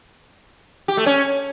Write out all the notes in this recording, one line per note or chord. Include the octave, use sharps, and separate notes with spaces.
G4
A3
C#4